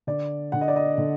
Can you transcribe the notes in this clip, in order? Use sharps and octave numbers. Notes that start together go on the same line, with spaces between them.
D3 D5
D3 F#5
D#5
D5
D#5
D3